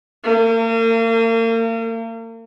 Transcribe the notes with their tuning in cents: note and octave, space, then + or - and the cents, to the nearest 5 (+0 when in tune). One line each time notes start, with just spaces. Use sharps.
A#3 -40